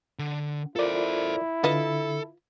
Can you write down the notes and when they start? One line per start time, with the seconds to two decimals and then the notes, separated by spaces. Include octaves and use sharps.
0.19 D3
0.76 E4 F4 A4 A#4 C5 D5
1.64 D3 F4 A4 B4 D#5